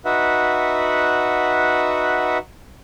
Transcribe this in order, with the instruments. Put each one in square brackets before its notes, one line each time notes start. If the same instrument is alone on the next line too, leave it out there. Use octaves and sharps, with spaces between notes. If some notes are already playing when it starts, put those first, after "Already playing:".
[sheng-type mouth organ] D#4 F#4 B4 E5 F#5